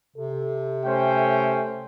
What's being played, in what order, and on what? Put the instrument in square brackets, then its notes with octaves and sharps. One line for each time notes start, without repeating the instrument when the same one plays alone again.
[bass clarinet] C3 [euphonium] A4
[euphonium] A3 [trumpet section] C#4 C5 G5